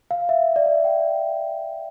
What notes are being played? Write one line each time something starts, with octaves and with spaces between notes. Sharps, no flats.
F5
E5
D5
E5
G5